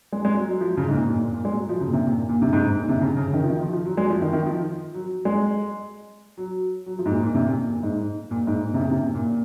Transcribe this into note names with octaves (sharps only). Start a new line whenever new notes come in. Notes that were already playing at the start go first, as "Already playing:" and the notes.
G#3
G#3
F#3
F#3
F3
C#3
G#2
A#2
A#2
A#2
A#2
G#3
F#3
F3
C#3
A#2
C3
A#2
A#2
A#2
C3
G#2
G#2
A#2
C3
C#3
C#3
C#3
D#3
F3
D#3
F3
F3
F#3
G#3
F3
D#3
D#3
F3
F#3
G#3
F#3
F#3
F3
G#2
A#2
A#2
C3
A#2
A#2
G#2
A#2
G#2
A#2
C3
C#3
C3
A#2
A#2